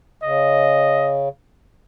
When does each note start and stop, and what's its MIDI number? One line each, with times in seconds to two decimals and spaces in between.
0.23 1.29 49
0.23 1.25 75